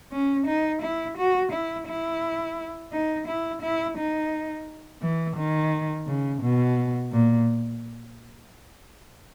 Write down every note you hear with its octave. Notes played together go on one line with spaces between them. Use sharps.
C#4
D#4
E4
F#4
E4
E4
D#4
E4
E4
D#4
E3
D#3
C#3
B2
A#2